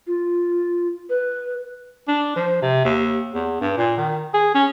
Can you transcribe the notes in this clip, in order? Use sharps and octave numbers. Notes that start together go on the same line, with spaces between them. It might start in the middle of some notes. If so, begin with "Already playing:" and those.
F4
B4
D4
F3
C3
D#2
E2
G2
A#2
D#3
G#4
C#4